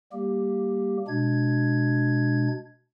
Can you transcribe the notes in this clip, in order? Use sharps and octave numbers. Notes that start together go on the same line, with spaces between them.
G3 A#3 G4
B2 G#3 D4 G#6